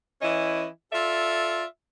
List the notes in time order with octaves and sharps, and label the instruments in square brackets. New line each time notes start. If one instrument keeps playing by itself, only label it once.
[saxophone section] E3 C#4 E4 D#5
F4 A4 D5 E5